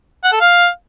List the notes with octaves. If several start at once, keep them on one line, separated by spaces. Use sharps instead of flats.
F#5
A4
F5